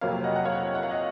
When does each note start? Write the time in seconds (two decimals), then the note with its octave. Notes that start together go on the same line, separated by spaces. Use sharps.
0.01 F2 C3 F#3 A#3 C#5 F5
0.24 D#5 F#5
0.36 F#5
0.45 C#5 F5
0.75 F#5
0.83 F5
0.91 D#5 F#5